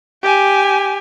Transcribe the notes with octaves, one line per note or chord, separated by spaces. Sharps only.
G4 G#5